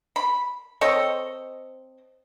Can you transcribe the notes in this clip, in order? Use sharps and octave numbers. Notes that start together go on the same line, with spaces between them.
B5
C4 A4 C#5 D#5